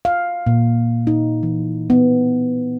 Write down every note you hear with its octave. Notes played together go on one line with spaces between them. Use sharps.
F5
A#2
D#4
E3
B3